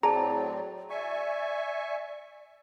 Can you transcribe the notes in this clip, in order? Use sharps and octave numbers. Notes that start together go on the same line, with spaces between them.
A2 F#3 C4 G#4 D5 A5 A#5
D5 E5 G#5 C#6